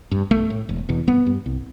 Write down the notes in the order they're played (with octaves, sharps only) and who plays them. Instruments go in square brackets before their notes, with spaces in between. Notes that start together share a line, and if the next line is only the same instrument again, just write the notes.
[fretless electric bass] G2
B1 A3
A2
E1
E2 B2
G1 B3
G2
C2